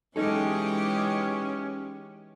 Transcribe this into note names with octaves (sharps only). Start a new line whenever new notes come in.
E3 G#3 C#4 D#4 G4 A4